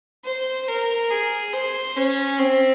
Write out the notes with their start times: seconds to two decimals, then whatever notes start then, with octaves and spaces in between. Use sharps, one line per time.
0.25 C5
0.68 A#4
1.11 G#4
1.53 C5
1.96 C#4
2.39 C4